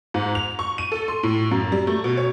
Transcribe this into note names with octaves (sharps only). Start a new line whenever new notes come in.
G#2
F7
C#6
D#7
A4
C6
A2
F#2
G3
A3
B2
C#5